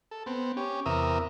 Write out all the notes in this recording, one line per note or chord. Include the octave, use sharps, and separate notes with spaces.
A4
B3 C4
C#4 G4
E2 C3 A#4 E5 D#6